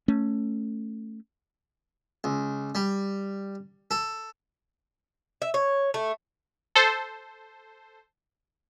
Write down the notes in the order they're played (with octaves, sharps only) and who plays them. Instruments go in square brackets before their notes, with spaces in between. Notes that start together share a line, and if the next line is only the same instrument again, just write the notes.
[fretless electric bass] A3 C#4
[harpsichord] C#2
G3
A4
[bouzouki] E5
C#5
A3
[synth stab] A4 C5